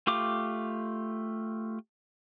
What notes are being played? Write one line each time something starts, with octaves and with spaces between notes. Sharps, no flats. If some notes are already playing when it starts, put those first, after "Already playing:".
A3 F4 G4 D6